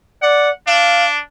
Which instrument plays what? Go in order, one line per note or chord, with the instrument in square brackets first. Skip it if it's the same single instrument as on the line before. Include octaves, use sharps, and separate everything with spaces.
[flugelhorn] D5 [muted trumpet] F#5
[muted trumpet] D4 [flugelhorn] F5